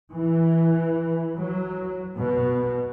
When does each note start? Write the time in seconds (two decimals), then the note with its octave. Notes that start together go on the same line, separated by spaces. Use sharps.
0.13 E3
1.37 F#3
2.18 B2